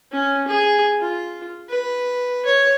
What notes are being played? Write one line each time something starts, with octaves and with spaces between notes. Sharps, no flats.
C#4
G#4
F4
B4
C#5